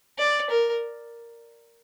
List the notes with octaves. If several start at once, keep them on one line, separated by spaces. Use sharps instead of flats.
D5
A#4